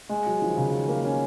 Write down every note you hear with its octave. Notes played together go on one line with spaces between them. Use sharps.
G#3
F#3
F3
D#3
C#3
D#3
A#3
C#4